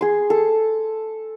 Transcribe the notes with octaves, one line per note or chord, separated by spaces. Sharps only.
G#4 C6
A4